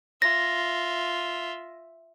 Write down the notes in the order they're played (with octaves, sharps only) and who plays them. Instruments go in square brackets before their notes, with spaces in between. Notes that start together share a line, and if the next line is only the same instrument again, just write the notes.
[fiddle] F4 E5 [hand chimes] A#6